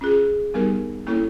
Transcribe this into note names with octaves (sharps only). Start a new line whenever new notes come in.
C#4 F4 G#4
G3 B3 D#4 G4 A#4
A#3 C#4 E4 A4 C#5